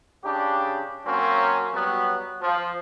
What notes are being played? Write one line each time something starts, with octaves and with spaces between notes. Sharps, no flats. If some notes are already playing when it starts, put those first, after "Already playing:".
C#3 D4 G4
F#3 A#3 C4 C#4
F#3 G3 B3
F3